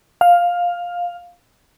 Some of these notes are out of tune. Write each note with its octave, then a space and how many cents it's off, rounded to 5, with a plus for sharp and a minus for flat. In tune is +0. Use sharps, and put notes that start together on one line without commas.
F5 +10